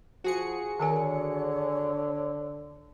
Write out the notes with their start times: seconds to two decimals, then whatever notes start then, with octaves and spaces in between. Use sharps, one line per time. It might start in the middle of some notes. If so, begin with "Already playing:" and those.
0.24 F3 F#4 G#4 C#7
0.80 D3 D#3 A#4 C#5 G#5